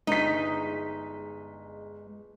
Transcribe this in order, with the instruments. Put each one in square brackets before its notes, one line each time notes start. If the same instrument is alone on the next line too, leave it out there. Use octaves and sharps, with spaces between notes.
[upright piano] G1 B6 [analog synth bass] G#3 [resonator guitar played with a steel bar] D#4